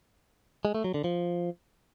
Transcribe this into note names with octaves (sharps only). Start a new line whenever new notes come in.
G#3
A3
F#3
D3
F3